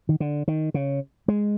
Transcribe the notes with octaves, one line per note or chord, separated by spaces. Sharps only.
D#3
D3
D#3
C#3
G#3